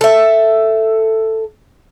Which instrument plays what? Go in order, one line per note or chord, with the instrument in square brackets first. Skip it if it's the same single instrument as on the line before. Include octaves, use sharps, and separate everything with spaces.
[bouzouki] A4 E5